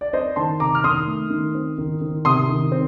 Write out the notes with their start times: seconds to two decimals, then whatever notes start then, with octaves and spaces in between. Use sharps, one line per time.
0.01 D5
0.13 C4 C5 D#5
0.36 D#3 A5 C6
0.60 C3 A#5 D6
0.75 F6
0.84 D#3 C6 D#6
1.07 A3
1.30 D#3
1.55 C4
1.78 D#3
2.01 D#3
2.25 C3 C6 D#6
2.49 D#3
2.72 C4